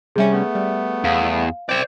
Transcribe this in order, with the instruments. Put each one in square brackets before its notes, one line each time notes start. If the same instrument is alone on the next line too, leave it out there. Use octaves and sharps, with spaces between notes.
[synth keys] C3 G3 C#4 [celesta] G#4 E5
[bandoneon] A3 B3
[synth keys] G3
[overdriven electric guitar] E2 [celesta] F5
[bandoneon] C4 [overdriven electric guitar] C5 D5 [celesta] G6